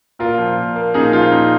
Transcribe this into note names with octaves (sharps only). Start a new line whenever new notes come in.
A#2 F4 A#4
F3
A#2
A#3
A#2 D#4 G#4
F3 F4
A#2 D#4